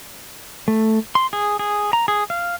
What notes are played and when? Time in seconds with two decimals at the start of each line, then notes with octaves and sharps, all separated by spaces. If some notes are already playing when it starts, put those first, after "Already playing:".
0.68 A3
1.15 C6
1.33 G#4
1.59 G#4
1.93 A#5
2.08 G#4
2.30 F5